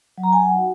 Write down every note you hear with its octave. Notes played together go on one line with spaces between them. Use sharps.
F#3
A#5
G#5
F#5
D#4 F#4